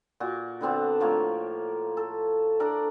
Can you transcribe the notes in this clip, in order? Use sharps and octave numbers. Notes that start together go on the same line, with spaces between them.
A#2 F#4
D3 B3 C4 D4
A2 F3 A#3 C#5
A4
D4 A4 A#4 D5